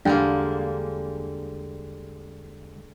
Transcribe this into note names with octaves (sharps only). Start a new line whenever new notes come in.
E2 D3 G3 G#3 A#3 D4 G5